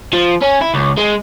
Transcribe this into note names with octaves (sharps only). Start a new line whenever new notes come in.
F3
C#4
E4
C#2
G#3